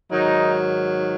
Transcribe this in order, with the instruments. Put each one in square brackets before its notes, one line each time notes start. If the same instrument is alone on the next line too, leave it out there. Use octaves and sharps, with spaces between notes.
[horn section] G#2 D#3 F#3 D#4